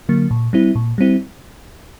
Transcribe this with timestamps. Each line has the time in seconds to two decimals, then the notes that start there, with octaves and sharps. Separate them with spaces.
0.09 D3 F#3 A#3
0.31 A#2
0.53 G3 C4 E4
0.75 A#2
0.98 G3 C4 E4